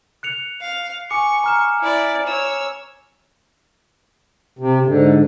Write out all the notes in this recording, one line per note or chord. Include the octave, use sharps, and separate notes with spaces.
F#6 C#7 F7
F5
G#5 C#6 D6 C#7
A#5 F6 E7
E4 D5
C#5 E6
C3
G#2 D3